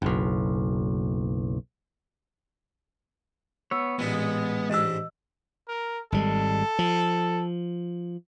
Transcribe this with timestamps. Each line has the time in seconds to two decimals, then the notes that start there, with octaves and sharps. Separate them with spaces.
0.02 F#1 B1
3.71 B3 C#5 E6
3.99 A1 A#2 G#3 B3 D4
4.70 A1 G#2 D4 D#5 E6
5.68 A#4
6.12 G#1 G3 G#3 A4
6.79 F3